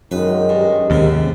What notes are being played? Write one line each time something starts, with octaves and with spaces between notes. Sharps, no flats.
F#2 D#3 G#3 D#4 B4
G2
D#2 G#2 C3 C#4